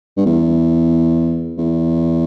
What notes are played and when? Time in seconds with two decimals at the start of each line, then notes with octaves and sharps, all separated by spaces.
0.17 G2
0.26 E2
1.58 E2